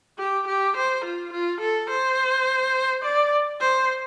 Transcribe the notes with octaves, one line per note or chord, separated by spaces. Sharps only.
G4
G4
C5
F4
F4
A4
C5
D5
C5